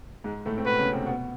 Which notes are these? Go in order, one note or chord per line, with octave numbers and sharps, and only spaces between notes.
G#2 G#3
A2 A3
C4
B2 B3 B4
C#3 C#4
C3 C4
B2 B3